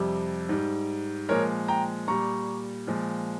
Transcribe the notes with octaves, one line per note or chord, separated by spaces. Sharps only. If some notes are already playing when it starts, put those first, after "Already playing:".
Already playing: F2 C3 G3
G#2 G3
A#2 F3 G#3 A#4 C#5
G5 A#5
A#2 G3 A#5 C#6
A#2 F3 G#3